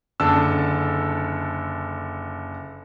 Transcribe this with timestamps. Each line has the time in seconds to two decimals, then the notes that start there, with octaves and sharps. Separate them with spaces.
0.20 F#1 D3 A4 A5 E6